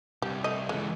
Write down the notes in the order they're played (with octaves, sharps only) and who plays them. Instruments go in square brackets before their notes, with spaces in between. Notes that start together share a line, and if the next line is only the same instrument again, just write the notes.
[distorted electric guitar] C2 [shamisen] G4
[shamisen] A3 D#5
[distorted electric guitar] C#2 E3 [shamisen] G#3